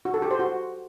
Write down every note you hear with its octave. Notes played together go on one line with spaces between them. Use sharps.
F#4
A4
G4
C5
F#4